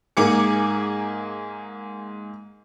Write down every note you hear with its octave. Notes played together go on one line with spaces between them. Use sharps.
G#2 A#3 G#4 D6 C#7